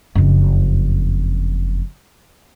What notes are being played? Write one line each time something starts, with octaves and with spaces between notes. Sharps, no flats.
F#1 F2